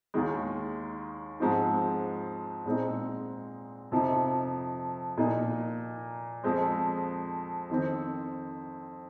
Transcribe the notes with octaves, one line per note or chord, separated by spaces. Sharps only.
D#2 D#3 G#3
G#2 F3 G#3 C4 D#4
A#2 G#3 C4 D#4
F2 C3 F3 C4 D#4
A#2 A#3 D#4
F2 F3 G#3 C4
F2 D#3 C4